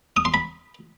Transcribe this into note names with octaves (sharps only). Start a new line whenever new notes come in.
D#6
C6
B5